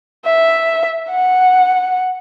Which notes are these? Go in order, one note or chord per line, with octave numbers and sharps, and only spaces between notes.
E5
F#5